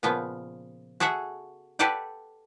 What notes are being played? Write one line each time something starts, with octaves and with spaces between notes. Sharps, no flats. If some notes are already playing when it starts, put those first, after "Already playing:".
A#2 C#3 F3 B3
F#4 G#4 A4 E5 F#5
G4 A4 B4 D5 F#5 G5